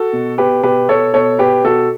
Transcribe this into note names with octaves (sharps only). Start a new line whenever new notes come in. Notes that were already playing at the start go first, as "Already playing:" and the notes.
Already playing: F#4 A4
B2
B2 G4 B4
B2 G4 B4
B2 A4 C#5
B2 A4 C#5
B2 G4 B4
B2 F#4 A4